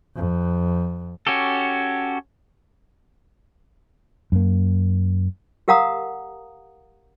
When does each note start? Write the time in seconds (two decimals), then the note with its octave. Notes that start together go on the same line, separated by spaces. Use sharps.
0.16 F2
1.27 C#4 F#4 G4 A4
4.32 F#2 A#3
5.68 G4 A#4 F5 F#5 A#5 D#6